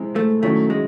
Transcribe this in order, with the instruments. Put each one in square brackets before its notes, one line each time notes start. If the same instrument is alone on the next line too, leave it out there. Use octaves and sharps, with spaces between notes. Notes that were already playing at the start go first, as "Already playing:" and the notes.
Already playing: [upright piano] C3 E3 G#3 C4 E4
[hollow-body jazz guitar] A3
[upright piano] D#3 F#3 C#4 E4 [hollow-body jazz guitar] A3
[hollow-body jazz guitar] G#3